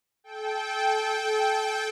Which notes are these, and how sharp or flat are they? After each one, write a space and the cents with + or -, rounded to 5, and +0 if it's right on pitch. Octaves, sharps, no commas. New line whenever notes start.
A4 -30 G5 +0